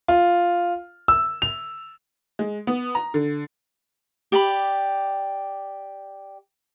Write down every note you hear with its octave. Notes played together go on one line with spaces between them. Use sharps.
F4
E6
F7
G#3
B3
A#5
D3
G4 D5 B5